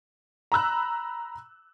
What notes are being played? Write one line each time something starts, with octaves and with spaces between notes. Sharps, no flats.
A#5 B5 E6 F#6